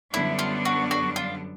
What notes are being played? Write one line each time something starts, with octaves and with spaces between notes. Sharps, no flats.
F#2 D3 G3 B3 D4 E4
F4
F#4
F#4
F4